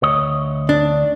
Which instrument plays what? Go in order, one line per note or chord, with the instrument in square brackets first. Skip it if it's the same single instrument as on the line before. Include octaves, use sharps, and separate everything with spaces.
[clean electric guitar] D2 C#5 D#5
[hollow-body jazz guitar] D4